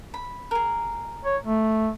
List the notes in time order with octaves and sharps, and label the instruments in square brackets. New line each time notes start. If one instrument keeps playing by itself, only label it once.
[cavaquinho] B5
G#4 A#4
[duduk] C#5
A3